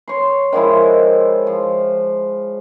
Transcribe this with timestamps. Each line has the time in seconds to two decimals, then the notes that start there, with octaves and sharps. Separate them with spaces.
0.08 C#5 C6
0.53 D#3 F3 G#3 E4
1.47 F3